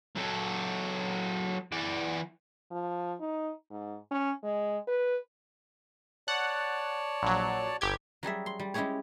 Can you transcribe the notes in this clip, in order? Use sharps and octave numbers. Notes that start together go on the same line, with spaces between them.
F#3 A4
E3 D5
F3
D#4
G#2
C#4
G#3
B4
C#5 D5 F#5 A5
A#1 F#3
G1 G4 G#6
F#3 G3 G#4 E5
C6
G3
G#3 C#4 E4 G4 G#4 C#5